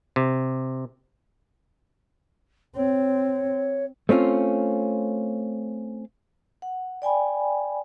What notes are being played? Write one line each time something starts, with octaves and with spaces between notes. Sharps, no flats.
C3
C4 C#5
A3 C4 C#4 F4
F#5
D5 G5 G#5 B5